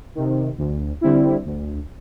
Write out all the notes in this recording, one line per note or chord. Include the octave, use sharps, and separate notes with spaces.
C3 D#3
D2
D3 G3 C4 E4
D2